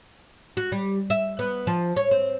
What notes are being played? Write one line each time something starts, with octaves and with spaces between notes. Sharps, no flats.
F#4
G3
E5
B3
F3
C#5
C4